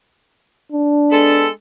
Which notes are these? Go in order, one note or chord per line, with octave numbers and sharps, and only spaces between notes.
D4
G#3 B3 A4